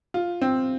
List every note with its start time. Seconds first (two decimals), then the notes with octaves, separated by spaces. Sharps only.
0.14 F4
0.41 C4